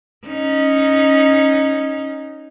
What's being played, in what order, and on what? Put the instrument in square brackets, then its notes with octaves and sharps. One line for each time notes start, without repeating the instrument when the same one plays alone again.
[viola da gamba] C#4 D#4